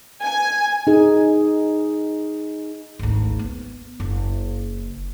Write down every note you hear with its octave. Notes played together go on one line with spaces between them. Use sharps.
G#5
D#4 G#4
G#1 D2
B3
F#1